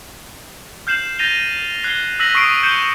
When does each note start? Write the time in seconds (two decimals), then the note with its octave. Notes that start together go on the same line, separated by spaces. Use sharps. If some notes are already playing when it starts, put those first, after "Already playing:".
0.87 F6 G6 C7 E7 F#7
1.19 G6 A6 A#6 D#7 F7 G7
1.84 F#6 G#6 C7 G7
2.20 E6 F#6 A#6 B6 D#7 F#7
2.35 C#6 D#6 B6 C7 D7 D#7
2.63 G6 C#7 E7 G7